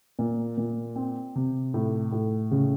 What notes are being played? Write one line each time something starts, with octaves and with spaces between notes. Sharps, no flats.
A#2
A#2
C4
C3
A2
A2
C#3